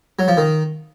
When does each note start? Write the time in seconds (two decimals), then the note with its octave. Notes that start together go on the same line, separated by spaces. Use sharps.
0.19 F#3
0.28 F3
0.37 D#3